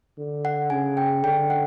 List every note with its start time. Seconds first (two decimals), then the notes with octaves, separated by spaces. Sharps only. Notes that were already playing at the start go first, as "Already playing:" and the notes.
0.18 D3
0.45 F#5
0.70 C#3 G#5
0.97 G5
1.23 D3 G5
1.50 F#5